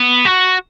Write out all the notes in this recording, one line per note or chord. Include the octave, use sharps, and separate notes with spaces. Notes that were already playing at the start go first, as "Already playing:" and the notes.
Already playing: B3
F#4